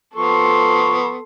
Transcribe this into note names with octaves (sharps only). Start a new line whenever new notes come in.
F3 B3 A4 C6 C#6